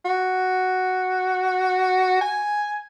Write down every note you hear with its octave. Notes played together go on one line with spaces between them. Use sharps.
F#4
G#5